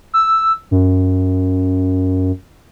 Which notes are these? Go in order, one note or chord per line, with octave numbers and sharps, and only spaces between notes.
E6
F#2